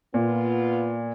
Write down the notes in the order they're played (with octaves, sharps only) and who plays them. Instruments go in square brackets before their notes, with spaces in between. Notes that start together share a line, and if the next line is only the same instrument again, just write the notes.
[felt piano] A#2 [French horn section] B3 F4